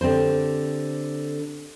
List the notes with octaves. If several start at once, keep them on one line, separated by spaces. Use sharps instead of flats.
D3 C4 G4 C5